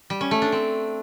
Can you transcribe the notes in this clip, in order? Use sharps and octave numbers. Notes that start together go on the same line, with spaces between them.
G3
C#4
A3
D4
C4